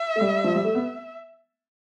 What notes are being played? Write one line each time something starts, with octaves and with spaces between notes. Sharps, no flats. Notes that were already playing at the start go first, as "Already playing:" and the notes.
Already playing: E5
A3
G3
F3
G3
A3
B3